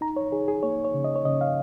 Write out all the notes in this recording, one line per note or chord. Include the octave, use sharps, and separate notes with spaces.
D#4 A#5
C#5
D#4 G#4
G#4
A#3 C#5
C#5
C#3
D#5
C#5
C#3 D#5
F5